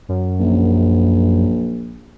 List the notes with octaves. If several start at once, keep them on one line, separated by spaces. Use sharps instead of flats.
F#2
A#1